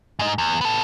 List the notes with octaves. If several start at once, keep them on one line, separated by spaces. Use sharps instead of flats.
G#2 D#4
E2
B3 A4